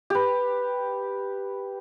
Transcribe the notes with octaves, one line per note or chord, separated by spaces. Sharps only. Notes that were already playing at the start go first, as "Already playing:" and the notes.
G4 B4